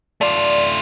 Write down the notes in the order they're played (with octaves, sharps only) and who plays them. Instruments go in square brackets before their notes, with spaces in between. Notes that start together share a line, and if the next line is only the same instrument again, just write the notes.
[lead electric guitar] A3 F4 [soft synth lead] D5